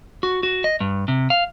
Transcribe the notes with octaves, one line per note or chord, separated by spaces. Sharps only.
F#4
F#4
D#5
G2
C3
F5